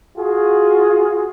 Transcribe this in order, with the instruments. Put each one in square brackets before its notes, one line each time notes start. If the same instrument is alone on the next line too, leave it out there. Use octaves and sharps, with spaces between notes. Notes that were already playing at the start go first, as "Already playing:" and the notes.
[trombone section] F4 F#4 G#4